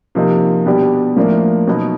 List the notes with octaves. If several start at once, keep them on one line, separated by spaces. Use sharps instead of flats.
C3 F3 A#3 D#4
B2 G3 B3 D4 G4
A2 F3 A#3 D4
B2 F#3 B3 D#4